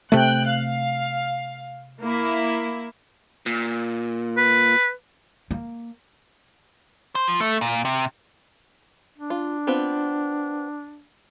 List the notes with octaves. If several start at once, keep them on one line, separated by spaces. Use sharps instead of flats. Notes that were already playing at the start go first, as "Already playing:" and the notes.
C3 A3 G5 F#6
F5
A#3 E4
A#2
B4
A#3
C5
F3
A3
A#2
C3
D4
F4
B3 C4 F4